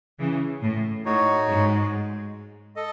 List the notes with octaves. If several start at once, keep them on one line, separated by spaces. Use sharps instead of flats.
C#3 E3
A2
A2 D#4 F#4 C#5
G#2
A4 D#5